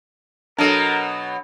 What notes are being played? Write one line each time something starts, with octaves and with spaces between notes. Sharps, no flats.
B2 F#3 D4 A4 A#4